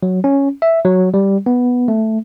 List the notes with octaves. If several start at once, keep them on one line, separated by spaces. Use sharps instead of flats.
F#3
C#4
E5
F#3
G3
B3
A3